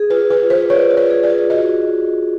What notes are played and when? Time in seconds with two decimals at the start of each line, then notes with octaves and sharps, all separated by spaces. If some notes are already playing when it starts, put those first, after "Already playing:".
Already playing: G#4
0.10 F4 B4
0.30 F4 B4
0.50 B4 C5
0.70 C#5 D5
0.90 F4
0.97 C#5
1.10 G#4
1.23 D5
1.30 F4
1.50 F#4 D#5